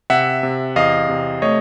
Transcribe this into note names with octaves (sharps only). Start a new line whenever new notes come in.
C3 E5 F#5
C3
E2 D#5 F5
C3
A3 C#5 D#5